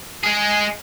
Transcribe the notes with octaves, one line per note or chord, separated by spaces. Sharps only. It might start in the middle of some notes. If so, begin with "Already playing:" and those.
G#3 G#4